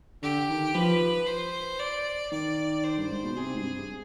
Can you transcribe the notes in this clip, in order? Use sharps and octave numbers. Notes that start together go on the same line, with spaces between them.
D3 G4
D#3
F3 B4
C5
D5
D#3 D5
C5
G2
G#2
B2
C3 G#4
G#2
G2